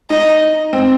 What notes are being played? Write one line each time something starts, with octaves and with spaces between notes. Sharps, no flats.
D#4 D#5
C4